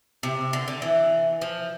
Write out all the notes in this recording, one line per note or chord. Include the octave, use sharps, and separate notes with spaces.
C3
D3
D3
E3
F3